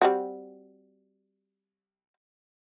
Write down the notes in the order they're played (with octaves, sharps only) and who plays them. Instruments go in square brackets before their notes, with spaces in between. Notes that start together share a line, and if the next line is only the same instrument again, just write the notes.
[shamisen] G3 C4 F#4